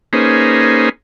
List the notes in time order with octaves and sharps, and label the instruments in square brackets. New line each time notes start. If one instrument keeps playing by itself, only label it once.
[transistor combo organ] A#3 C#4 D#4 G#4 B4 C5